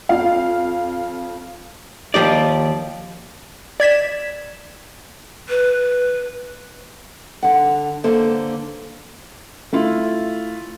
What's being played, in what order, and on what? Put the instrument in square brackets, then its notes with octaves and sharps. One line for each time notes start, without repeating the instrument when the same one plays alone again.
[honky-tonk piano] F2 F5
[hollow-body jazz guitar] D#2 G#2 F3 G4 D5
[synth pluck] D5 G#6 B6 E7
[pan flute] B4
[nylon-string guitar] D3 F#5
D3 A#3 A4 C5
[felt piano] A3 E4 F4